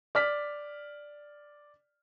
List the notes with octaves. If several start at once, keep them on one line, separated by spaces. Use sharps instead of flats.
D5 F6 B6